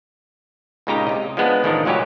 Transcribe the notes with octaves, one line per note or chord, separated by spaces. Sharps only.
C#2 A#2 C#3 D#4 G4 A#5
C3 D#5
F3 G#3 B3 D4
A1 D#3 F3 D4 A#4
C#2 A#2 F#3 C#4 G4 C#5